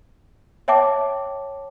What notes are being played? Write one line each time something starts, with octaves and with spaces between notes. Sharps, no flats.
C#5 E5 G5 A5 D6